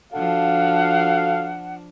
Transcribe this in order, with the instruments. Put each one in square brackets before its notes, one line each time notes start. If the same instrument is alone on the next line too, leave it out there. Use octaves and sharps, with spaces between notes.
[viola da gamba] F3 D4 [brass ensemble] F#4 A4 F5 [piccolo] F#5